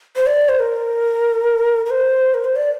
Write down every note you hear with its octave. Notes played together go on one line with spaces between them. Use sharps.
C5
D5
C5
A#4
A#4
C5
A#4
C5
D5